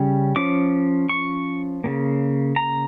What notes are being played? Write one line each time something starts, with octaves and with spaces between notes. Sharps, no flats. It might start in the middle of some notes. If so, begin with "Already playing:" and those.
Already playing: C#3 G3 C#4
F3 C#4 D6
C#6
C#3 F3 A#3
A#5